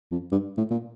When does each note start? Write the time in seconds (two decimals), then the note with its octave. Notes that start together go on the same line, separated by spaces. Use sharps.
0.11 F2
0.32 G2
0.57 A2
0.71 A#2